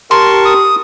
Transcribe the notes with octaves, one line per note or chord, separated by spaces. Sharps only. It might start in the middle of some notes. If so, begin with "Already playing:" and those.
G4 A#4 A5 C6 C#6
D#6